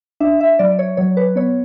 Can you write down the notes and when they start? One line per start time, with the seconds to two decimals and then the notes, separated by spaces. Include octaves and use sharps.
0.20 D4 E5
0.40 E5
0.59 F#3 D5
0.79 C#5
0.97 F#3 C#5
1.17 B4
1.36 B3 C#5